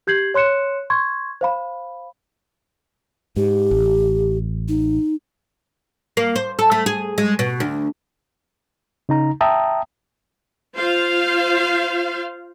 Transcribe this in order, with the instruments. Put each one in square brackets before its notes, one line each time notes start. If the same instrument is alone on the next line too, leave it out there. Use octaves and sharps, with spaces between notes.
[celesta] G4 G6 G#6 C7 F#7
C#5 C6 F#6 C#7 E7
C6 C#6 G#6
C5 F5 B5
[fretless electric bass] G#2 [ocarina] G4
[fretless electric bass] A1
[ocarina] D#4
[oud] A#3
C5
A4
A3
G#4
G#3
B2
D2
[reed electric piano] C#3 D#4 A#5
E5 G5 A5 A#5 D#6
[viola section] F4 C5 F5